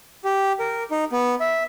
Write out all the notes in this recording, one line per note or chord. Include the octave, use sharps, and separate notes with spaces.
G4
A#4
D#4
B3
E5